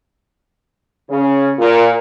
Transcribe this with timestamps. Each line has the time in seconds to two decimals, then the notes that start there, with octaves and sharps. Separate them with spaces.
1.10 C#3
1.59 A#2